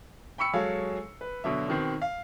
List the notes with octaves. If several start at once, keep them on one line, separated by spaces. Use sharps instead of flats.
G5 B5 C#6 E6 C#7
F#3 G#3 G#4 A4 C#5 F5
B4
B2 D3 F#3 E5
B2 D#3 C4
F5